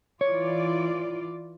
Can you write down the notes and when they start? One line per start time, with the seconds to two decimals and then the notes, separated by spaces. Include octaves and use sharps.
0.21 E3 F4 C#5 D5